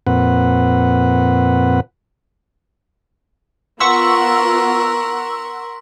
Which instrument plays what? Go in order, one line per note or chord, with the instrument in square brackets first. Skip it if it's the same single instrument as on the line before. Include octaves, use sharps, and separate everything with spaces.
[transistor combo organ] F2 A#2 C4 B4 F#5
[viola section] B3 F4 [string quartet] A#4 [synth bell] F#5 C#6 E6 [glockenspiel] C6 B6